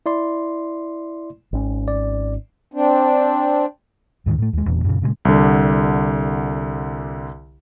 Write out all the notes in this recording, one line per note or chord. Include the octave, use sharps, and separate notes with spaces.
E4 D5 C6
G#1 C#4
D5
C4 D4
D2 G#2 D3 D#3
A2 A3
D#2 G#3
E1 E2 A#2 D4
F#2 A#2 C#3
A#2 C#3 E3 G#3
C2 D3